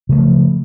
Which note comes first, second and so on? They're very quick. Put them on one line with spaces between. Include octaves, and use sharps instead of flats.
C#3 G#3 A3 F3